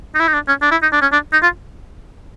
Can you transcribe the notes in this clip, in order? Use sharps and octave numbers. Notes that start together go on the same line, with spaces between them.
D#4
E4
D#4
D4
C#4
D4
E4
D#4
D4
C#4
D4
D#4
F4